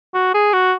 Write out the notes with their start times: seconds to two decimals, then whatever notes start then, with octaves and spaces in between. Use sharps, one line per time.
0.14 F#4
0.34 G#4
0.53 F#4